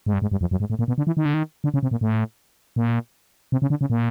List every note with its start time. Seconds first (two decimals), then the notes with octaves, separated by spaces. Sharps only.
0.06 G#2
0.13 G2
0.22 G#2
0.32 G2
0.41 F2
0.51 F#2
0.60 G#2
0.70 A2
0.79 A#2
0.88 B2
0.98 D3
1.07 E3
1.17 D#3
1.25 D3
1.34 D#3
1.64 D3
1.74 C#3
1.83 C3
1.91 A#2
2.01 A2
2.76 A#2
3.52 C3
3.62 C#3
3.70 D3
3.81 C#3
3.90 A#2